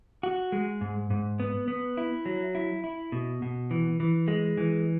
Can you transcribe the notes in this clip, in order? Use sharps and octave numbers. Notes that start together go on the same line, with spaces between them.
F#4
G#3
G#2
G#2
B3
B3
E4
F#3
E4
E4
B2
B2
E3
E3
G#3
E3